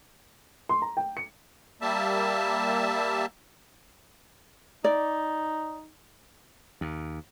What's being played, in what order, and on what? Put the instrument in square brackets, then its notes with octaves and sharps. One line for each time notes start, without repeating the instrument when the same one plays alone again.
[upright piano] C6
A#5
G5
C#7
[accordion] G3 A#3 E5 A5
[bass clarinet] D#4 [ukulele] D5
[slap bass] D#2